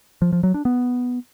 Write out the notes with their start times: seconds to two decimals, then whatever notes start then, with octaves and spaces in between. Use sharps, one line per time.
0.22 F3
0.33 F3
0.43 F#3
0.54 D4
0.65 B3